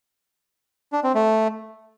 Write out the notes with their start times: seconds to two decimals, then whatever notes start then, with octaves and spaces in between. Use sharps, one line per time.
0.93 D4
1.04 C4
1.15 A3